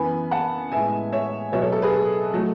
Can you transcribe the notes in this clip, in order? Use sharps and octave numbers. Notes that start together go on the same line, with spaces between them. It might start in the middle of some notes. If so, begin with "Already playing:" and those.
Already playing: F#2 E3 B3 G#5 B5
F#5 A5
A2 G#3 B3 E5 G#5
C#5 E5
B2 F#3 B3 C#5 E5
A4 C#5
A4
G#4 B4
A4
F#3 A3